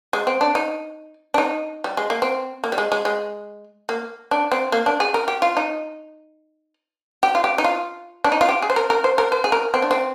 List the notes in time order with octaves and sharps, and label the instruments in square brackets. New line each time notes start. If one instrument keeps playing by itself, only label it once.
[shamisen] G#3
C4
D4
D#4
D4
D#4
G3
G#3
A#3
C4
A#3
G3
G#3
G#3
G#3
A#3
D4
C4
A#3
D4
G#4
A#4
G4
F4
D#4
G4
F4
G4
D#4
F4
D4
D#4
F4
G4
G#4
C5
A#4
A#4
C5
A#4
C5
G#4
A#4
C4
D4
C4